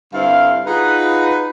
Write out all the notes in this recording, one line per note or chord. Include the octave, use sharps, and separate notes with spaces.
G2 D3 C4 E4 F5
D#4 F4 F#4 G#4 B4